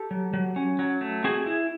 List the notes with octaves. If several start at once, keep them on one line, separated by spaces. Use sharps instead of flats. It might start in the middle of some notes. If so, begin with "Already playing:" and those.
Already playing: G4 A4
F#3
F#3
C#4
F#3
A3
C4 F#4 G#4
E4